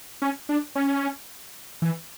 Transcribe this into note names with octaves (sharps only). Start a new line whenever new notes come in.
C#4
D4
C#4
E3